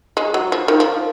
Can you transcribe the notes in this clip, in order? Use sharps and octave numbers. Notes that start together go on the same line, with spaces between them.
G#3
F#3
F3
D#3
F3